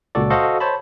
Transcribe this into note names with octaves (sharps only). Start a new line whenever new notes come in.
C#2 A#2 F#4 A4 D5
F#4 A4 C5 D#5 F5
C5 C#5 A5 B5